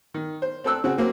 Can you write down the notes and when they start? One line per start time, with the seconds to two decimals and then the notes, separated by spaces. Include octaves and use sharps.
0.14 D#3
0.42 C5
0.64 C4 A4 E6 F#6
0.84 C#3 C4 F#4
0.97 F#3 A#3 C4